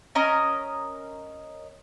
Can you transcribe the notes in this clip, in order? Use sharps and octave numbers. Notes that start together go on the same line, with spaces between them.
C#4 A#4 D#5